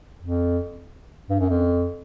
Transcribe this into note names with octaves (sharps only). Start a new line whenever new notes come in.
F2
G2
F#2
F2